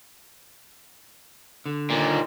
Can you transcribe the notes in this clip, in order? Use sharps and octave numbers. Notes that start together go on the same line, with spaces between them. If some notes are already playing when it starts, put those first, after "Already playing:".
D3
D#2 A#2